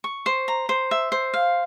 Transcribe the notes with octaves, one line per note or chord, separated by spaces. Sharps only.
C#6
C5
A#5
C5
E5
C5
F5